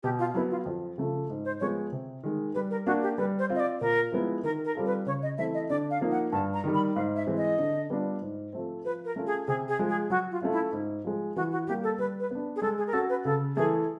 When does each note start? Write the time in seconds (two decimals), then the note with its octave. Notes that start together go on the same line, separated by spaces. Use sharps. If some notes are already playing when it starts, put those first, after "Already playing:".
0.03 B2 G4
0.19 F4
0.34 F#3 E4
0.37 B3
0.50 F4
0.66 F2
0.98 C#3 F3 A3
1.30 G#2
1.45 C5
1.60 F3 G#3 B3 C#5
1.92 C3
2.24 D#3 G#3
2.54 G3 B4
2.70 A#4
2.86 A#3 D4 F#4
3.02 G4
3.18 G3 B4
3.39 C5
3.50 C4 F4
3.55 D#5
3.60 D5
3.81 A#2 A#4
4.12 F3 G#3 B3 E4
4.43 D#3 A#4
4.65 A#4
4.75 G3 C4 F4 A4
4.86 B4
5.06 C#3 C#5
5.22 D#5
5.38 E3 A3 C4 E4 E5
5.54 D#5
5.70 D3 D5
5.90 F5
6.01 F3 A#3 D#4
6.11 F#5
6.32 G2 A5
6.54 A#5
6.64 D#3 G3
6.74 B5
6.95 G#2 F5
7.16 E5
7.27 E3 G#3 C4
7.37 D#5
7.59 D3
7.90 G3 B3 D4 F4
8.21 G#2
8.53 F3 A3 C4
8.85 F3 B4
9.05 A#4
9.16 A3 C#4 F4
9.27 G#4
9.47 C3 G#4
9.68 G#4
9.79 F3 G#3
9.89 G#4
10.10 F#3 F#4
10.31 F4
10.42 A3 C#4 F4
10.52 E4
10.73 G#2
11.05 F3 G#3
11.36 E3 F#4
11.52 F#4
11.67 G3 A#3 G4
11.83 A4
11.98 G3 B4
12.20 B4
12.31 B3 D4
12.56 G#4
12.62 G#3 A4
12.78 G#4
12.87 A#4
12.93 C#4 F#4 A4
13.09 B4
13.24 C#3 A4
13.56 E3 A3 G#4